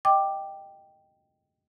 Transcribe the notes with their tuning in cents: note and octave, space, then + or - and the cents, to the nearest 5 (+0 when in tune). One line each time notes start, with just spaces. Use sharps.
D#5 +0 G5 +0 D6 +10